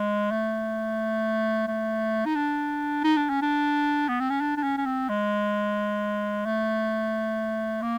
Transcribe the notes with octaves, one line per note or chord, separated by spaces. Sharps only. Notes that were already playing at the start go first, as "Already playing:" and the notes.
Already playing: G#3
A3
A3
D#4
D4
D#4
D4
C#4
D4
B3
C4
C#4
D4
D4
C#4
C#4
C4
G#3
A3
A#3